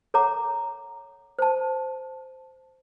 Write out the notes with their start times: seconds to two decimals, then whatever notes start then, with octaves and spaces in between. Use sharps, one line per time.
0.14 A4 C#5 F#5 A#5 D6
1.39 C5 A5